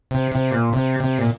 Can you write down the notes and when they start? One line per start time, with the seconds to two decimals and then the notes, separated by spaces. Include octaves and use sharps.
0.11 C3
0.32 C3
0.51 A#2
0.73 C3
1.00 C3
1.18 A#2